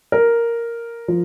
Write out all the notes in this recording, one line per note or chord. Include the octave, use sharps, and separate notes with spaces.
A#4
F3